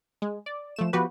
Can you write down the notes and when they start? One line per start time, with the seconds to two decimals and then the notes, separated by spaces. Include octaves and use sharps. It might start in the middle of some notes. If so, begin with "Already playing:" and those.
0.22 G#3
0.46 D5
0.76 F3 A3 E7
0.93 F3 B3 F#4 G4 B4